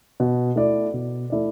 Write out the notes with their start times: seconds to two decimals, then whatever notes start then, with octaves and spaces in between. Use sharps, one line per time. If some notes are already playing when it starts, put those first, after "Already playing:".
0.20 B2
0.56 A3 E4 D5
0.93 B2
1.30 A3 E4 D5